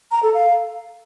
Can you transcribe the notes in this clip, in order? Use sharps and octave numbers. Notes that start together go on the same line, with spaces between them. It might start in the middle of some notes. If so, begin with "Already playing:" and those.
A#5
A4
F5